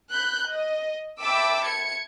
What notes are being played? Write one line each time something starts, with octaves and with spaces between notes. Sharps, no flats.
B5 F#6 G6
D#5
E5 G5 A5 B5 D6 E6
G#6 C#7